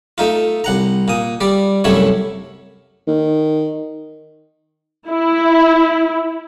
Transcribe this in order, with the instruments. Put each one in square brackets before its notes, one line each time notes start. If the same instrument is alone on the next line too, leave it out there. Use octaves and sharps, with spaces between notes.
[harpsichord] A3 D#4 F4
C2 F#5 A#5
A#2 D#6
G3 D5
C2 F#2 A3 E4 C#5
[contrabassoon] D#3
[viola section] E4